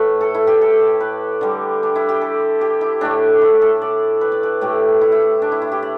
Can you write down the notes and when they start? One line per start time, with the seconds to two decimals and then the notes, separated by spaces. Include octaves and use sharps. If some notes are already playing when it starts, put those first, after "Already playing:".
Already playing: A2 A3 B4
0.21 A4
0.35 E4
0.47 G4
0.61 A4
1.00 B4
1.41 D3 G3
1.83 D4
1.96 E4
2.09 G4
2.21 A4
2.61 G4
2.81 E4
3.01 A2 A3 D4
3.41 E4
3.62 A4
3.82 D5
4.21 B4
4.32 D5
4.43 B4
4.61 A2 A3 G4
5.01 E4
5.12 E4
5.42 D4
5.52 E4
5.62 E4
5.72 G4
5.82 D5